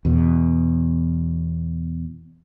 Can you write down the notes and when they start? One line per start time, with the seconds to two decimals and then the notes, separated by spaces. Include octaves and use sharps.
0.05 E2 B2